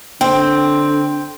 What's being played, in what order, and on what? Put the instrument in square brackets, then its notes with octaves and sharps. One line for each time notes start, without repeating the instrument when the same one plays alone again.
[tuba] D3 [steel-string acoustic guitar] C4 [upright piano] G5